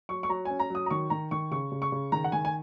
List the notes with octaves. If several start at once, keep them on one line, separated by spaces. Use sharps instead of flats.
F#3 C#6
C#6
F#3 A#5
C#4 G#5
A#5
F#3 D#6
A#5
D#3 C#6
D#3 A#5
D#3 C#6
C#3 C#6
C#3
C#6
C#3
D#3 A#5
F#5
D#3 G#5
G#5